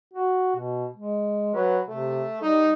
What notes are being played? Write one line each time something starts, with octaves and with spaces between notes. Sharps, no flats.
F#4
B2
G#3
F#3 B4
C3 A3
G3 D#4